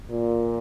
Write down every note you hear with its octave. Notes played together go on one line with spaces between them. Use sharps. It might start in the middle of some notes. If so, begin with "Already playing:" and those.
A#2